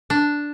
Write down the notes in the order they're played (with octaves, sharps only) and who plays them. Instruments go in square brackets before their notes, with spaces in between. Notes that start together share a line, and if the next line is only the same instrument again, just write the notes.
[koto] D4